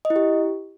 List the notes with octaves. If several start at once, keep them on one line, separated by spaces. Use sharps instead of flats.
D#5
E4
G4